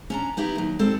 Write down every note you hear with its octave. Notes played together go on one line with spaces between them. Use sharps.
C#4 D4 A#5
B3 D#4 E4 G4
D#2 F#3
G3 G#3 C4 A4